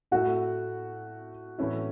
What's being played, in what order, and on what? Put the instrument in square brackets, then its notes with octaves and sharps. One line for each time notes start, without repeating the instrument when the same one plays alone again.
[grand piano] A2 A3 E4 [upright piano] F#4
[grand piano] A2 E3 A3 C#4 E4